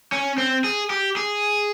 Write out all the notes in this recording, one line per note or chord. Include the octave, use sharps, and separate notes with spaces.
C#4
C4
G#4
G4
G#4